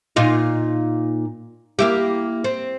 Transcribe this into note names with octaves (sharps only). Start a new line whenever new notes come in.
A#2 D#4 F4
A#3 E4 G4
C4